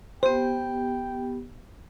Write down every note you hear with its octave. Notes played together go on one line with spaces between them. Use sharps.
B3 G4 C5 G5